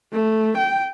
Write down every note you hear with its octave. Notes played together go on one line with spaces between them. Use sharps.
A3
G5